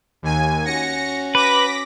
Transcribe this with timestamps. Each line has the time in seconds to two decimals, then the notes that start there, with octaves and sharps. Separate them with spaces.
0.22 D#2 G#5
0.65 C#4 F#4 A#6 C#7
1.35 B4 D6 A#6 B6